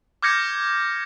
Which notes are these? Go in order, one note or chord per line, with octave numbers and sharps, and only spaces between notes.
D6 F6 G6 G#6 A#6 C#7